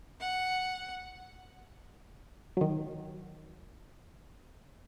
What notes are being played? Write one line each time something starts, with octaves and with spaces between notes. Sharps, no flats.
F#5
D#3 F#3